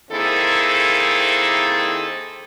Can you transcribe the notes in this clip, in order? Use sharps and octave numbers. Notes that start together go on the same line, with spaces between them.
D#3 A#3 C4 E4 G#4 A4